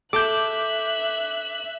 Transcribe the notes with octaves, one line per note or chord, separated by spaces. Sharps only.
A4 E5 D6 F#6 G6